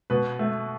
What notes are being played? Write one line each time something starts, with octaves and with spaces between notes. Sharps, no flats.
B2 B4
A3